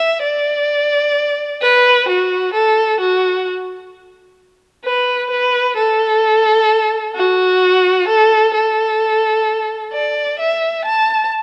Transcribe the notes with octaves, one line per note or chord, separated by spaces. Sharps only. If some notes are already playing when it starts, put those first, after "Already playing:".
Already playing: E5
D5
B4
F#4
A4
F#4
B4
B4
A4
F#4
A4
A4
D5
E5
A5